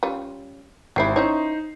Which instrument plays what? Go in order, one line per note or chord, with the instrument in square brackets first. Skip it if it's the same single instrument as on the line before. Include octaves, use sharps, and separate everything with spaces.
[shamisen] G3 C#4 F4
[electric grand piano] G#1 C7 [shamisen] G3 C4 E4
[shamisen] C#4 E4 C#5 [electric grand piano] D#4 C5